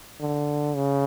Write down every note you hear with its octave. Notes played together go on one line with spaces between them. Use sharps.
D3
C#3